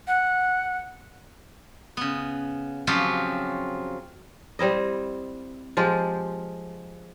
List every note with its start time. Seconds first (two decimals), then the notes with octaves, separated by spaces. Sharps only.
0.07 F#5
1.97 C#3 B3
2.87 C#3 F3 F#3 C4 F4 G4
4.59 G3 C4 E4 D#5
5.77 F3 G#3 F4 G4